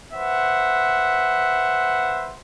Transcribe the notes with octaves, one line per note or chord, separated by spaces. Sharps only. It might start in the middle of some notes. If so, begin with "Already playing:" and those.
B4 C5 E5 F#5